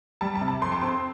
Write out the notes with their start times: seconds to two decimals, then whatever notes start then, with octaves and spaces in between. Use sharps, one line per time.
0.21 G3 A5
0.35 A5
0.41 C3
0.48 A5
0.61 F2 C6
0.72 A5
0.82 C4 C6